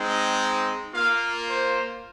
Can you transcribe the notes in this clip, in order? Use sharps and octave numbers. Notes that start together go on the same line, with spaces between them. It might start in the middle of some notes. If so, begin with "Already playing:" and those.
Already playing: G#3 C4 D#4
A#3 F4 F5
C5